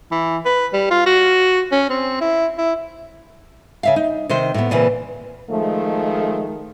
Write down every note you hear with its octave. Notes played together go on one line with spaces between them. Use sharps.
E3
B4
G3
F4
F#4
C#4
C4
E4
E4
C#3 E5 F5
D#4
C3 D#3 C5
A2 B3
A#2 C#3 E3 C4
D#3 F3 G#3 A3